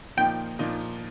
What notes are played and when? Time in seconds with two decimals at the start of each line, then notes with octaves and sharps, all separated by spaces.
0.17 A#2 F3 A#3 D#4 G5
0.59 A#2 F3 A#3 D#4